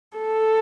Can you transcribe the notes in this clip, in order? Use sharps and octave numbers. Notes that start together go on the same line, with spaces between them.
A4